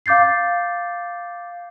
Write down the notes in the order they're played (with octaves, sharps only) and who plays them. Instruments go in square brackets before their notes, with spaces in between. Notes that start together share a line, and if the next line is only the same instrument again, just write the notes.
[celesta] F5 D6 G6 A6 C7